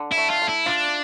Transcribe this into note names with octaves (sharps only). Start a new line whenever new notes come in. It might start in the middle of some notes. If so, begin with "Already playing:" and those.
Already playing: D3
E4
A3
F4
A3
E4
D4 F4